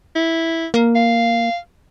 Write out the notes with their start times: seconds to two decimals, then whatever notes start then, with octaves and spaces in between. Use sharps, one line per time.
0.15 E4
0.74 A#3
0.95 F5